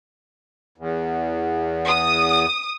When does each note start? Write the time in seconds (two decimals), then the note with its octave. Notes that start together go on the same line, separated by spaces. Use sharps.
0.78 E2
1.87 D#6